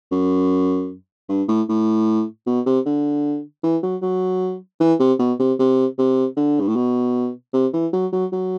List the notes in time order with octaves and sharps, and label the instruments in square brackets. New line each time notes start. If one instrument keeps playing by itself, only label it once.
[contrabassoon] F#2
G2
A2
A2
B2
C3
D3
E3
F#3
F#3
E3
C3
B2
C3
C3
C3
D3
G2
A2
B2
C3
E3
F#3
F#3
F#3